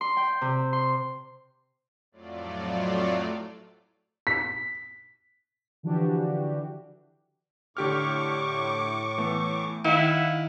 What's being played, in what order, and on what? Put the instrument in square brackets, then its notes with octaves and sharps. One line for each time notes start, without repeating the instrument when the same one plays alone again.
[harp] C6
G5
C3
C6
[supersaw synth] F2 A2 F#3 A3 F4 D5
[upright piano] B6
[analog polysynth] D3 E3 F3 D4 F#4 G4
[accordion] A2 C#6 D6 [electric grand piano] D3 G4 F6
[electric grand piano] E3 A3 B3
[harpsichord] D#3 [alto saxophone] E4 [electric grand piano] F5 B6 [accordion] F#5